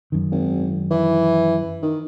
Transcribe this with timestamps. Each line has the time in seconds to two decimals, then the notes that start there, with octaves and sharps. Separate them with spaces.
0.12 F#2 D#3
0.31 G#1
0.91 E3
1.82 D#3